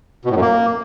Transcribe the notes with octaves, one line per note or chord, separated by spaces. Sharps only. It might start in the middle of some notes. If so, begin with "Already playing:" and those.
B2
A2
F#2
A#3